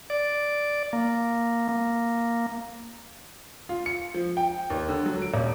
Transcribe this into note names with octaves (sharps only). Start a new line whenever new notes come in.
D5
A#3
A#3
F4
C#7
F3
G5
D#2
D3
F#3
D7
D#1